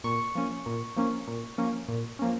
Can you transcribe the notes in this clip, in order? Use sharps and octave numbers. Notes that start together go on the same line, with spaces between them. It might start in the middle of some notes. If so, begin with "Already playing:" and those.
A#2 C#6
F3 A#3 C#4
A#2
F3 A#3 C#4
A#2
F3 A#3 C#4
A#2
F3 A#3 C#4